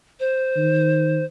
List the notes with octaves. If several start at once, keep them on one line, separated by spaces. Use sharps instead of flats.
C5
D#3